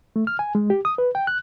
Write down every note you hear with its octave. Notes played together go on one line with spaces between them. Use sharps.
A3
F6
G#5
G#3
G4
D#6
B4
G5
F#6